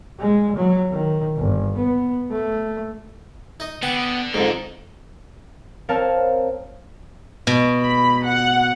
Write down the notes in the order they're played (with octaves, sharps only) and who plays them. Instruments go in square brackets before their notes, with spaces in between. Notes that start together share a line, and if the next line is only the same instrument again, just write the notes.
[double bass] G#3
F#3
D#3
G1
B3
A3
[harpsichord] D#4 D#5
[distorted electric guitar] D3 [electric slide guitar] B3 [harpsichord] G5
[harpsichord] F2 G#2 [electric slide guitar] G#3 D#4
[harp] C4 A#4 C#5 F5 A5
[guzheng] B2
[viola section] B5
F#5